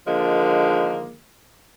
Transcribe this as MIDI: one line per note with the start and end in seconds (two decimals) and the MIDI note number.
0.07 1.17 50
0.07 1.17 51
0.07 1.17 53
0.07 1.17 56
0.07 1.17 58